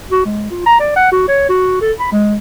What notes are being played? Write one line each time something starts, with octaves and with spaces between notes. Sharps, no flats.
F#4
G#3
F4
A#5
D5
F#5
F#4
C#5
F#4
A4
B5
G#3